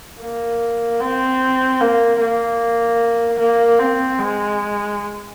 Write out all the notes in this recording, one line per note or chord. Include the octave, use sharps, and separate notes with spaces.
A#3
C4
A#3
A#3
A#3
C4
G#3